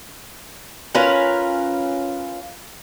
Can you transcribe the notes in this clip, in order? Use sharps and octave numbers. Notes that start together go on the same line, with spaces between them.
C#4 F4 A#4 B4